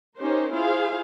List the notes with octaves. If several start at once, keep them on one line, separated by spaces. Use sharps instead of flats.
C#4 D#4 G4 A#4 C5
E4 F4 G#4 C5 F5